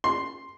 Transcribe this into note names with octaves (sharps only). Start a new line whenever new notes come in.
C6